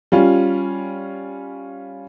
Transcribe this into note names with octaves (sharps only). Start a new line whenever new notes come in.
G3 C#4 F4